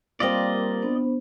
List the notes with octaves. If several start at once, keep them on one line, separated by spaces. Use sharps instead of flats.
G3 A#3 C4 F4 D5 D#5
B3 D4 C5